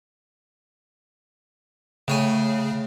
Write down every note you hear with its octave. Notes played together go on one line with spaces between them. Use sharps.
A2 C#3 C#5 G#5